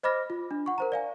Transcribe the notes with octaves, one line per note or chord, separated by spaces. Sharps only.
C5 D#5 B5 D6 F6 A#6
F4
D4
F#5 C#6
A#4 C5 A#5
D5 F5 G#5